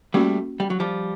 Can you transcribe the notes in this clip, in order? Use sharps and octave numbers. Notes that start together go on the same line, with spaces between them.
G3 A3 A#3 C#4 F#4
G3
F#3
F3 G3